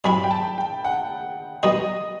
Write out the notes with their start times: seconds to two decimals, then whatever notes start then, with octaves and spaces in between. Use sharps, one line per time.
0.04 G2 F#3 C4 E4 B5
0.24 G5
0.31 A5
0.58 G5
0.84 F#5
1.63 G3 B3 D#4 F#4 D#5